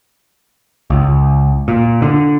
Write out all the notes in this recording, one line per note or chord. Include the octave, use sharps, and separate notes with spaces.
C#2
A#2
D3